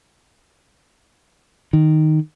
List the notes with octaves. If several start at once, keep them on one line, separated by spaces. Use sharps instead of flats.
D#3